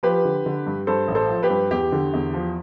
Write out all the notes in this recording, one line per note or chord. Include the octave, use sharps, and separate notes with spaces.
F3 G4 B4
D3
D3
G2
G2 A4 C5
A1
A4 C5
F3
G4 B4
G2
E2 G4
D3
E2
F3